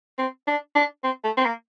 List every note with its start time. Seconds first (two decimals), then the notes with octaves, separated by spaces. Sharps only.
0.18 C4
0.47 D4
0.75 D4
1.04 C4
1.24 A3
1.37 C4
1.46 A#3